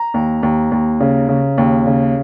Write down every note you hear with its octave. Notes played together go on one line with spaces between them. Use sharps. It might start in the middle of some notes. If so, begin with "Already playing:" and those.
Already playing: A#5
D#2
D#2
D#2
C#3
C#3
D#2
C#3